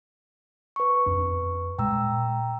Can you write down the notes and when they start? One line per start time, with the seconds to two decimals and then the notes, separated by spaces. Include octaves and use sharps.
0.76 B4 C#6
1.06 F2 D4
1.78 A#2 G#3 G5 A#5 E6